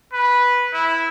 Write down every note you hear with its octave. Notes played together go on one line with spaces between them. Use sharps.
B4
E4